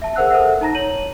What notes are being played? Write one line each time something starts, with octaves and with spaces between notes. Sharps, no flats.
E5 A5
G#4 A#4 C5 F#5 E6 F#6
A4 A#4 C5 E5 F#5
D#4 A5 A#5 A#6
C#5 D#7 F#7